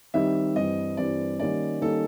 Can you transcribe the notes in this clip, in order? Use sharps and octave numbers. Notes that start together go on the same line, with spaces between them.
D#3 G3 C4 D#4 E5
G2 E3 G3 C4 D#5
G2 E3 G3 C4 D5
D#3 G3 A#3 C#4 D5
D#3 G3 A#3 C#4 A4